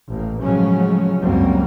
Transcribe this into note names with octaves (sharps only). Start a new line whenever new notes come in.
A1 A#3
A2 C#3 F3 F#3 G#3 C#4
C#2 F#2 F#3 G3 A#3 C4